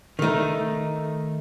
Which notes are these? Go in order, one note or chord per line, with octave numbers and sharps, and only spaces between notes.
D#3 A3 D#4